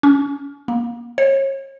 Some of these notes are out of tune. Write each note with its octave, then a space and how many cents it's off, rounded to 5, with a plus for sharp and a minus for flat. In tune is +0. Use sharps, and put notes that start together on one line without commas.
C#4 +30
A#3 +30
C#5 -35